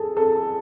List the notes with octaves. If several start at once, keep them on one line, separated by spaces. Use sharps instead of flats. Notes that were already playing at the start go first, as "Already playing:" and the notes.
Already playing: G#4 A4
A4